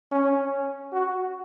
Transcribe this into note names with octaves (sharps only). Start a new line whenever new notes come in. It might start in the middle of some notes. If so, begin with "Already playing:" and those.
C#4
F#4